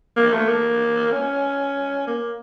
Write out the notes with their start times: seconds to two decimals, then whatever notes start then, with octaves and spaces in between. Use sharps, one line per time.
0.17 A#3
0.33 A3
0.48 A#3
1.12 C#4
2.07 A#3